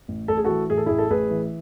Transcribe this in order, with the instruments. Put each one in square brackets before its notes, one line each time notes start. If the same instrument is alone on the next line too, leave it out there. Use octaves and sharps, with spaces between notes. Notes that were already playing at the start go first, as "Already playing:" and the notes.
[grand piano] A1
A1 A4
G#4
E3 F#4 A4
A2 G#4
A4
A1 E4 G#4
A4
A1 G#4 B4
E3